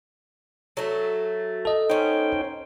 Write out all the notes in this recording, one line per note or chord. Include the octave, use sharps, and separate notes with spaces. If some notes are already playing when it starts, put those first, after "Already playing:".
F#3 A3
A4 D#5
B3 C#4 D#4 C5 G5